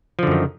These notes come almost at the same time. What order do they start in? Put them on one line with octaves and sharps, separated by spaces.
F3 D3 F#2 D#3